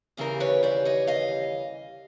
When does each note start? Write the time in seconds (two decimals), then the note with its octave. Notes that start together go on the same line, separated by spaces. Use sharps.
0.17 D#2 C#3 E3 G3 A#4 C5
0.40 B4 C#5
0.63 C5 D5
0.85 C#5 D#5
1.07 D#5 F5